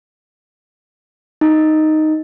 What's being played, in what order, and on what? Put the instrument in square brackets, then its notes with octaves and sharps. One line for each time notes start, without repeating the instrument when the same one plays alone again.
[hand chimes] D#4